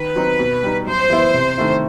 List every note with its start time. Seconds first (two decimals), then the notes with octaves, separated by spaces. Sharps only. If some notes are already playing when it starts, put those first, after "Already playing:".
Already playing: D#3 B4
0.16 F#3 C4 D#4
0.39 B2
0.63 G3 D#4
0.87 F#2 C5
1.10 E3 B3 E4
1.34 C3
1.58 D#3 A3 E4